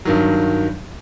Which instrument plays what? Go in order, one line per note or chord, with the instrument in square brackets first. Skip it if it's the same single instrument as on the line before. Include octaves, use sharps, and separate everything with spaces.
[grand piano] G2 D#3 F#3